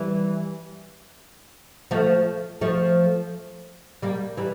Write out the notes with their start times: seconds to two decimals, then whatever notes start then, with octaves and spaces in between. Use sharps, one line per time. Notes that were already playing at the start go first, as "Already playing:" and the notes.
Already playing: E3 G3
1.91 F3 A3
2.61 F3 A3
4.02 G3 A#3
4.37 E3 G3